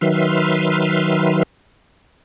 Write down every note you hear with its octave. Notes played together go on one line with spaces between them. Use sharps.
D#3 F#3 B4 E5 C6 F6